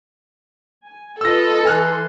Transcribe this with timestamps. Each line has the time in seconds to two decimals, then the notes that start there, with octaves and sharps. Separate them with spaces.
0.86 G#5
1.21 F4 A4 B4 D#5 E6 A#6
1.65 E3 G#5 C6 F6 F#6